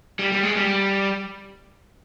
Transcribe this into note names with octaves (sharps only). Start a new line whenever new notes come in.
G3
G3
G#3
G3